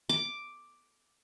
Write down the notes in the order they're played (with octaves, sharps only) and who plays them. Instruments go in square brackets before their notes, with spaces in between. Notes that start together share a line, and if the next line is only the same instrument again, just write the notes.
[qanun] D6